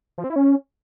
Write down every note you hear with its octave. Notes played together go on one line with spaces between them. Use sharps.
F3
C4
E4
C#4